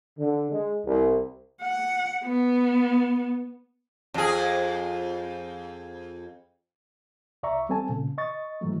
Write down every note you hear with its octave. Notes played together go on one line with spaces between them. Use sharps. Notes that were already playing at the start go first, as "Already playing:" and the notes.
D3
G#3
C2
F#5
B3
F2 G#4
C2 D5 E5 A#5 C#6
G3 C4 A4 G#5 A5
A#2 C#3
D#5 C#6 A6
G#2 E3 F#3 A3